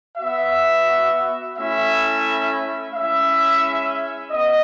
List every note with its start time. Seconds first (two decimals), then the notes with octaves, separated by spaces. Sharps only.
0.17 B3 F#4 E5
1.56 A3 C#4 E4 E5
2.94 G#3 C#4 E4 E5
4.32 B3 D#5